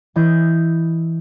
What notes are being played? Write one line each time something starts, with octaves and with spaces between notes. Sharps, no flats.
E3 E4 D#5 G6